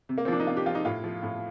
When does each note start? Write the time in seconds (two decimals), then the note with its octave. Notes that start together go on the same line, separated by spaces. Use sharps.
0.09 C3
0.18 A#3
0.25 C4
0.28 F3 D4
0.40 D#4
0.47 C3 F4
0.57 G4
0.66 F3 F4
0.75 D#4
0.85 A2 F4
1.04 F3
1.23 A2